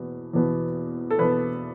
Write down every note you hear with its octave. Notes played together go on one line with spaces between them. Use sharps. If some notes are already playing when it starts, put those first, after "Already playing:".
Already playing: E2 B2 B3
E2 B2 B3
A4
E2 B2 B3 B4